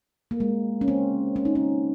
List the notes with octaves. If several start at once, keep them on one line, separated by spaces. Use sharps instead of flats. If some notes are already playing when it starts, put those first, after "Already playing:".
A#3
G#3
C#4
C4
C#4
D#4
C#4